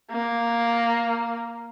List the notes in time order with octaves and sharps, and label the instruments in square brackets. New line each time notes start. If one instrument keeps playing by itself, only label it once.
[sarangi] A#3